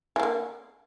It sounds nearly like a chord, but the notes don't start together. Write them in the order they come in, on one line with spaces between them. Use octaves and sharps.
E3 A#3 D3